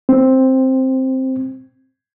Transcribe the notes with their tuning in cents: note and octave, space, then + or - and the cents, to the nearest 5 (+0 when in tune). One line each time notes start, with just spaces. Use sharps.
C4 +5